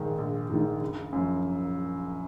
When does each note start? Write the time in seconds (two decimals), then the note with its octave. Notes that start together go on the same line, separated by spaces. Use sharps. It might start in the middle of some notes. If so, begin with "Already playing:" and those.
Already playing: A#1 G#2 D#3
0.18 A#1
0.49 G#2 D#3
0.81 F#1
1.13 F#2 F3